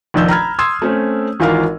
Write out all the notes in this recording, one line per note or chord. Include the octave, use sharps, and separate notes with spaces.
F1 A#1 D#3 E6 G6
A#5 B5 F6 G#6
C6 D#6 E6 G#6
A3 C4 C#4
G#1 E3 F4 A#4 F5